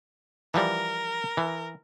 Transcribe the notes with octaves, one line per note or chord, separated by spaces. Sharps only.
E3 F3 G3 A#4
E3